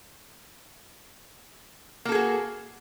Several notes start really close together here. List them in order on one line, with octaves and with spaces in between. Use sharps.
A#3 A4 G#4 F#4